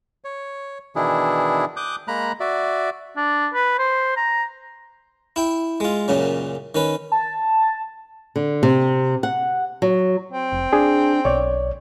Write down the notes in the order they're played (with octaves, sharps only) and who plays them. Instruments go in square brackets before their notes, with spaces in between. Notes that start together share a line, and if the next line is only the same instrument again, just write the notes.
[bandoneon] C#5
B2 D#3 E3 D4 E4 G#4
D6 D#6 F#6 G6
G#3 A#3 A#5 B5 F#6
F#4 D5 E5
[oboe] D4
B4
C5
A#5
[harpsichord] E4 G5
G#3 F4
F#2 A#2 C#3 F#3
D#3 C#4 B4
[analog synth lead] A5
[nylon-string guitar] D3
C3
F#5
F#3
[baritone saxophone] C4
[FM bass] F1
[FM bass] D4 [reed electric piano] G#4
[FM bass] B1 [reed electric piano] C#5 D5